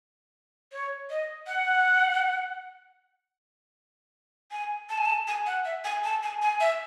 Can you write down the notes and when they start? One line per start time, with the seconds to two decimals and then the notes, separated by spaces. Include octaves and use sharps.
0.72 C#5
1.10 D#5
1.47 F#5
4.51 G#5
4.89 A5
4.98 G#5
5.05 A5
5.27 G#5
5.46 F#5
5.65 E5
5.84 G#5
6.04 A5
6.23 G#5
6.42 G#5
6.60 E5